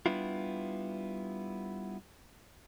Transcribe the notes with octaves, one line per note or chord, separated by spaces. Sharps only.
G3 B3 D4 E4 F4